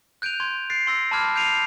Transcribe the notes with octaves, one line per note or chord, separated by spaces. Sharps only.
F#6 G6 D7 D#7 F7
C6 G#6
F#6 A6 C7 D7
C6 E6 A#6
A5 B5 C6 D6 F6 G#6
G6 C7 D7 D#7 F7